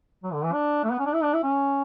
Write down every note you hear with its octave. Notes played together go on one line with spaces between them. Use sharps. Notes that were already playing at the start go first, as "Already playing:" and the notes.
F#3
D3
E3
D4
A3
B3
C#4
D4
E4
D4
E4
C#4